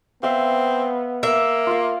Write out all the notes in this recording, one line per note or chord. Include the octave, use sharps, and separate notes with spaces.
B3 C4 E5 F5
A#3 E5
F4 F5